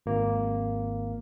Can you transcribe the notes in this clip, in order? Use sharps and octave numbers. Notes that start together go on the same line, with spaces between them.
G#1 A#3